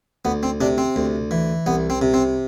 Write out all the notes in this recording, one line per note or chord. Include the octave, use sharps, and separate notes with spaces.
D2 B3
C4
C3 D4
C4
D2
E3
C2 B3
C4
C3
C4